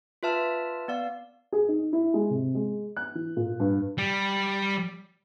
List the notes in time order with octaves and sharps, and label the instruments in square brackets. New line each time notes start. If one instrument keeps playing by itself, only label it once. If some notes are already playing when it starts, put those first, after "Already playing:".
[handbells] F4 B4 E5 A5 F6
B3 D5 F5
[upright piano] G#4
D#4
E4
G#3
C3
G#3
F#6
E3
A#2
G2
[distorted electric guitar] G3